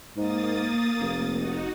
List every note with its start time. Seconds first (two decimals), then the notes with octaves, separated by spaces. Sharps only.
0.17 G#2 A#3 D#6 A6
1.01 F1
1.35 D#4 F#4